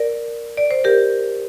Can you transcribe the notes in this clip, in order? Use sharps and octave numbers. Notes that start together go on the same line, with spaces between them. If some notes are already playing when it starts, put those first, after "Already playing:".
Already playing: A#4 D5
D5
C5
G4 A#4